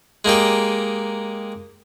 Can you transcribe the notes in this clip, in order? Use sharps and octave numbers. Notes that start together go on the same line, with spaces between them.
G#3 A#3 D#4 G4